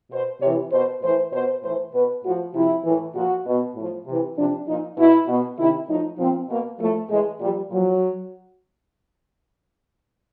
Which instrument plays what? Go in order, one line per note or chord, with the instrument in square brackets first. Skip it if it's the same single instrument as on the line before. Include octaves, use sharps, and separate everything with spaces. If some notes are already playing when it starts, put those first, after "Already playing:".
[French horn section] B2 C5
C3 E3 C#5
B2 C5
A2 E3 C5
B2 C5
A2 E3 C5
B2 B4
A2 F3 F#4
C3 F3 E4
A2 E3
A#2 F3 F#4
B2
A2 F3
C3 E3
C3 F3 D4
A#2 F3 D#4
B2 E4
B2
C3 D#3 E4
A2 F3 D#4
A#2 F3 C4
B2 A#3
A2 F3 A3
A2 E3 G#3
A#2 F3 G3
A#2 F3 F#3